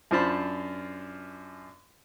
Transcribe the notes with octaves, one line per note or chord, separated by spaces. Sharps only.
F#2 D4 F4 C5 A5 B5